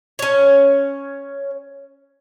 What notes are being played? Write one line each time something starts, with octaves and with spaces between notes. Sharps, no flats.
C#4 C#5